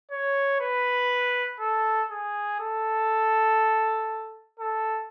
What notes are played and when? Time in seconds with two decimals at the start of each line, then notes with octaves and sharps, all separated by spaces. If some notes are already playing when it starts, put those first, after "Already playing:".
0.12 C#5
0.60 B4
1.60 A4
2.11 G#4
2.60 A4
4.59 A4